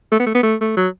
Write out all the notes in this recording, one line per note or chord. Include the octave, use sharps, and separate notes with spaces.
A3
B3
A3
B3
A3
A3
F#3